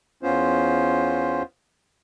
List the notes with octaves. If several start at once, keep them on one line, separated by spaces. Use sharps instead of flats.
E2 B3 C#4 F4 C5